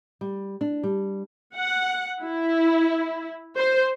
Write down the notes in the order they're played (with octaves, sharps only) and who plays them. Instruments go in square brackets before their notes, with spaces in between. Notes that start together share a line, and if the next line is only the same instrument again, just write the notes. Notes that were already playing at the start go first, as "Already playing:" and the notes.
[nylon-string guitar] G3
D4
G3
[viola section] F#5
E4
C5